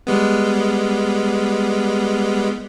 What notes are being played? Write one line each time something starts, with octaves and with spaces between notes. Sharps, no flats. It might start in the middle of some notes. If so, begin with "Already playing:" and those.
G3 G#3 B3